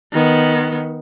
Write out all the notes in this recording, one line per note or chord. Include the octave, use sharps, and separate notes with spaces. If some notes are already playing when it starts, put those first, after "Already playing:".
D#3 B3